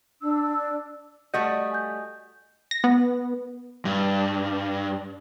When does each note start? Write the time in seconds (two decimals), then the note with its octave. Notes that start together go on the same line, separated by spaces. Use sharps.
0.21 D4 E6
1.34 G3 A3 F#4 D#5 G6
1.72 G#5 G6
2.71 A#6
2.84 B3
3.85 G2